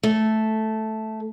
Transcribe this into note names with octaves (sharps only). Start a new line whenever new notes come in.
A3